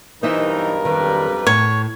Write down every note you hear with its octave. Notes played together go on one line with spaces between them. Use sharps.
B1 G2 E3 D#4 A#4 C5 D#5 E5
F2 D#3 G3 B4
A2 C#5